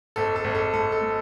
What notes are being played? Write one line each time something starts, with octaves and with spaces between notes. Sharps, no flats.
G#1 A4
A4
G#1
A4
G#1 A4
A4
G#3